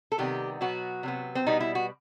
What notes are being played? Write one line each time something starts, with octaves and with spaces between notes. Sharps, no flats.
A4
C3 D#3 G3 B3 G4
B2 F#3 B3 F#4
C3 F#3 B3
C4
B2 G3 B3 D#4
E4
F#4